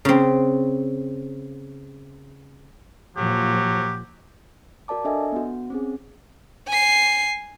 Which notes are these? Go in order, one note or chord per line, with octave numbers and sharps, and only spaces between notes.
C#3 C4
A#2 F3 F#3 G4
F#4 A#4 D5 A5 D6
D4 A4 D#5 E5 G#5
B3 F#4
C4 C#4 G#4
G#5 C7